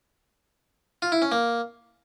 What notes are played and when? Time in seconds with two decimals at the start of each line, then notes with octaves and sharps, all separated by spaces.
1.02 F4
1.12 E4
1.22 C#4
1.32 A#3